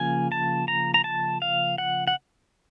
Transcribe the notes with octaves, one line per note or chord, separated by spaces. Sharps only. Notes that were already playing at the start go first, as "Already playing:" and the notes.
Already playing: C#3 F3 A#3 G#5
A5
A#5
A#5
A5
F5
F#5
F#5